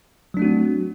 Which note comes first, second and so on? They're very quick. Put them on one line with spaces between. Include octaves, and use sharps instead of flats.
F#3 D4 A3 F#4 C4